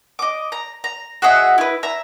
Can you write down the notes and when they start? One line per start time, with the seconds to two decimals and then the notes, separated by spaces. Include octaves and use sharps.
0.19 D#5 D6
0.52 A#5
0.84 A#5
1.22 F#4 G#4 D#5 E5
1.58 E4 B4
1.83 E5 A#5